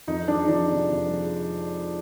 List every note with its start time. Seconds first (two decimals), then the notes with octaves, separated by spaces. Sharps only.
0.08 F2 D#4
0.28 G#3 D4
0.48 F3 D4
0.69 C3
0.89 F2
1.09 G#3